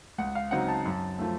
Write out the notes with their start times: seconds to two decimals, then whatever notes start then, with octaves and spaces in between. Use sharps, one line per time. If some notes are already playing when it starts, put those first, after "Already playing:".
0.18 C#2 F#5
0.35 F5
0.51 C#3 F#3 C4 D#4 F#5
0.68 A5
0.85 F#2
1.19 F3 A3